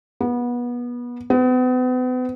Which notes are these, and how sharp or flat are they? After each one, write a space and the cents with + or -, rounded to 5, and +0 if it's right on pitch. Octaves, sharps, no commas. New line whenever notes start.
B3 -25
B3 +40